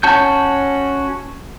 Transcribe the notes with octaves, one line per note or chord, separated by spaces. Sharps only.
C#4 F#4 A5 G6